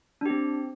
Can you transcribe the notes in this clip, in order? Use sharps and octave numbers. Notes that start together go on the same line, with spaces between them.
C4 D4 G4